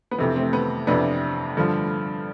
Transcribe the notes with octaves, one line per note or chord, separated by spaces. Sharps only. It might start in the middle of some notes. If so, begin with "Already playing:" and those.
B3
F2 C3 E3 A3 C4
A3 C4
B3
F2 C3 E3 B3 D4
G2 D3 F3